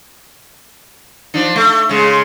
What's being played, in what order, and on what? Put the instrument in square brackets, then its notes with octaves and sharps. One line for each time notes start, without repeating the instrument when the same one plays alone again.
[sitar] F3 D4 D#4
A3
C#3 G#3